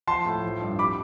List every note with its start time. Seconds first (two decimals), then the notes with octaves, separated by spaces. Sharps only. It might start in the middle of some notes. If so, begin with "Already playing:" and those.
0.07 F3 A5 C6
0.25 A2
0.43 F3
0.61 G2
0.79 G3 B5 D6